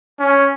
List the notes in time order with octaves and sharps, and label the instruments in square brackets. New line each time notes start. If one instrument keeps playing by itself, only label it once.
[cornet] C#4